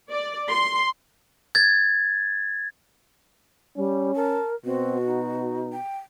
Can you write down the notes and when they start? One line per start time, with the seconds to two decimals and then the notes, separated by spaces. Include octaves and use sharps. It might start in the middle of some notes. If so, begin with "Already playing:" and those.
0.11 D5
0.51 C6
1.55 G#6 A6
3.76 G3 C#4
4.16 A#4 A5
4.65 B2 C4 F#4
5.06 D#4
5.73 G5